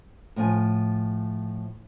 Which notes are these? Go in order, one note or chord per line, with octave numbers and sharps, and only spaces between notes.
A2 F3 G#5